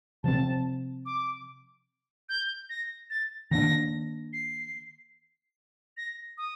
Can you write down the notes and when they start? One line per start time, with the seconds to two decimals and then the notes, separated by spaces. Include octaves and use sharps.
0.23 C3 F3 C4 A5
1.06 D6
2.29 G6
2.69 A#6
3.10 A6
3.51 D#3 A#3 D4 A#6
4.33 C7
5.97 A#6
6.38 D#6